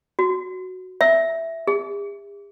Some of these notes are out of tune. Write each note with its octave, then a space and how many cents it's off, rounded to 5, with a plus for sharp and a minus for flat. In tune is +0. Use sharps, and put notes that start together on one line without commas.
F#4 +0
E5 +0
G4 +45